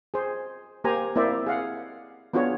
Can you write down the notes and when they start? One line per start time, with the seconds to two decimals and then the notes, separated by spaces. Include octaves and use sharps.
0.14 G#4 C5
0.84 A#3 G4 C5 G#5 A#5
1.15 A#3 C4 E4 C5 D5 E5
1.47 G#4 F5 F#5
2.33 B3 D4 F4 F#4 G#4 C#5